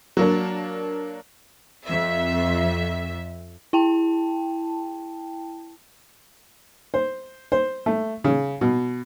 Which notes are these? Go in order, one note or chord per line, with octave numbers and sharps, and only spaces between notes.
F#3 A#3 D4
F2 E5
E4 G5 A5
C5
C5
A3
C#3
B2